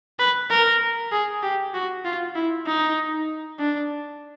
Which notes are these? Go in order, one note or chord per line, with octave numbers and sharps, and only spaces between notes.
B4
A#4
G#4
G4
F#4
F4
E4
D#4
D4